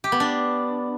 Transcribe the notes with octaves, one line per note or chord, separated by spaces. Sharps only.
G4
B3
D4